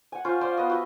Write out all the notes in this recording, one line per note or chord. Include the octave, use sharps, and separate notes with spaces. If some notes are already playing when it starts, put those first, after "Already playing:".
F#5 G#5
C#4 F4 C5
C5 D5 F5 C6
B3 D#5
E4 F#4